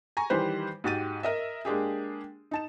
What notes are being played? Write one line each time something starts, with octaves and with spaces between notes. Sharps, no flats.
G#5 A#5 C#6
D#3 E3 G3 G4 B4 C5
G#2 F#4 G4 A6 D#7
A#4 D#5 E5
G#3 A#3 D4 G4 G#4
D#4 A5 E7